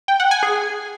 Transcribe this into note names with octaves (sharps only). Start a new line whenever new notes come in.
G5
F#5
G#5
G#4